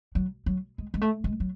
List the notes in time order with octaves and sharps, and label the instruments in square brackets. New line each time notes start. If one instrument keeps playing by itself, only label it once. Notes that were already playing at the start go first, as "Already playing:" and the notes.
[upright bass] F#3
F#3
G#3
G#3
A3
G#3
F#3